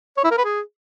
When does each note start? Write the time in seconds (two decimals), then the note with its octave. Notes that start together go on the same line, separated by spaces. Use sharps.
0.17 C#5
0.24 E4
0.31 A#4
0.38 B4
0.45 G#4